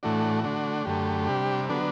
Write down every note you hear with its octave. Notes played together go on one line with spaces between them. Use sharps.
A2 E3 A3 D4 F#4
D3 A3 D4
F#2 D3 A3 G4
C3 G3 D4
D3 F#3 B3 D4 A4